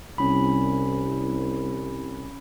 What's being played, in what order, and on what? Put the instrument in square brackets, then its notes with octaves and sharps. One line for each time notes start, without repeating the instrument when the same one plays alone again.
[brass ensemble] C2 [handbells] C#4 B5